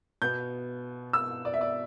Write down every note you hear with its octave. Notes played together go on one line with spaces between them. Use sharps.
B2 B3 G6
E6
D5
E5
D5